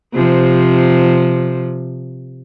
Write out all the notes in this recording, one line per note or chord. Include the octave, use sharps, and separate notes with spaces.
C3 F3